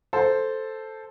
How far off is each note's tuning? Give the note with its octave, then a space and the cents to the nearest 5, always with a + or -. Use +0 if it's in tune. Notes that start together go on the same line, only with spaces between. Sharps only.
A4 +0 C5 +0